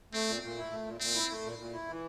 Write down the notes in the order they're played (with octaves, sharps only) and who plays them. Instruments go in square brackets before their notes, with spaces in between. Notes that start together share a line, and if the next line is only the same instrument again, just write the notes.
[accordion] A3 [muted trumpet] C4
[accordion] A#2
A#2
E4
A3
A#2
[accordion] A#2 [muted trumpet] C4
[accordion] E4
A3
A#2
A#2
E4
E3